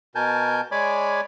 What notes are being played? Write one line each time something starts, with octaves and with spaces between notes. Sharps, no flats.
B2 A#4 G#5 A5 G6
G#3 C#5 D5 G#5 B5 D6